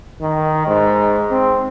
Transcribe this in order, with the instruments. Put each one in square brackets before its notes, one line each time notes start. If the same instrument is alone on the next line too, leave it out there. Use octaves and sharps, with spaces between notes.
[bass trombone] D#3
G#2
C4